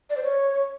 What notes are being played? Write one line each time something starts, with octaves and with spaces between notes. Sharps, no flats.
D5
C5
C#5